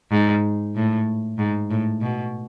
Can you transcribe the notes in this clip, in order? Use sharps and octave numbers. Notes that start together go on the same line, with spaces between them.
G#2
A2
G#2
A2
B2